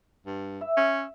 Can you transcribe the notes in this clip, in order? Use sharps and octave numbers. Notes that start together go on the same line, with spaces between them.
G2
E5
C#4